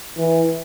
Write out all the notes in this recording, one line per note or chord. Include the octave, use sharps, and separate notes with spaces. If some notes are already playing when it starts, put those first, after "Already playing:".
E3